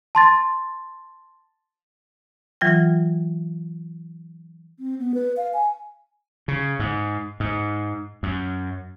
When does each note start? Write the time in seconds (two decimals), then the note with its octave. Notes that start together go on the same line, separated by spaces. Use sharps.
0.15 A5 C6 A6
2.61 E3 F#3 F4 G5
4.80 C4
4.99 B3
5.14 B4
5.37 F5
5.53 G#5
6.48 C#3
6.79 G#2
7.40 G#2
8.23 F#2